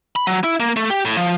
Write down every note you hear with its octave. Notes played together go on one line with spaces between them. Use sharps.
B5
F#3
E4
A#3
A3
G4
A2
F3